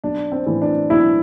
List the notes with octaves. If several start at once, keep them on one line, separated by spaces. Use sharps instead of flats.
B1 D4
C4
A2 E3
D4
B1 E4